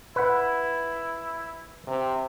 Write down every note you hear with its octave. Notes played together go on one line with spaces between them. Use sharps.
E4 B4 F#5
C3